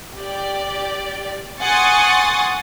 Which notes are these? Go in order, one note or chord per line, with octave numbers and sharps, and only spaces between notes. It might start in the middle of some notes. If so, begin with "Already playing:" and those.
G4 D5
F#5 G#5 C6 C#6 D#6 A6